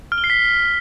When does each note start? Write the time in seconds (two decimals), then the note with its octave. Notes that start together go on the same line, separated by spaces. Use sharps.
0.12 F6
0.18 G7
0.24 C7
0.30 B6